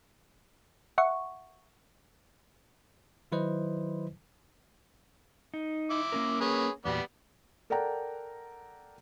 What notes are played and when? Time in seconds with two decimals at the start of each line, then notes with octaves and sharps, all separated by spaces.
0.98 E5 F#5 C#6
3.32 D#3 F#3 E4 B4 C5 D#5
5.54 D#4
5.90 E4 D6
6.12 A#3 C#4 A#4
6.41 G#4 B4 C#5
6.85 E2 A#2 G3 B3 F#4 D5
7.70 A4 A#4 D5 F#5 G5 A#5